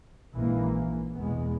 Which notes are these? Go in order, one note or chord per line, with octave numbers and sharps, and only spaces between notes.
A#1 G#2 E3 A#3
E2 B2 G#3 B3